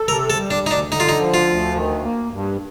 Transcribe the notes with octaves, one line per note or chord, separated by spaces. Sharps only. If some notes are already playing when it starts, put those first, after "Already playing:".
Already playing: A4
C3 A#4
A4
G3
D4
D2 D#4
D4
D3 D#4
F4
D#4
F3
F4
D2
D#3
A#3
G2